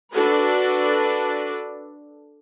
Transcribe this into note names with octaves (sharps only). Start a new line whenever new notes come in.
D4 F#4 A4 B4